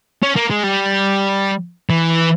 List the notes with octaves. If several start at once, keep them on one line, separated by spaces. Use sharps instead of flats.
C#4
A#3
G#3
G3
E3